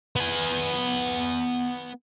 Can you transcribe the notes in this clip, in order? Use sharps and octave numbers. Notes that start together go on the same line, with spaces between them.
B3 G#5